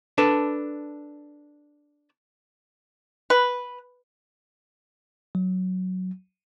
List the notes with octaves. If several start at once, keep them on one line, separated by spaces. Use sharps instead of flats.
D4 A4 B4
B4
F#3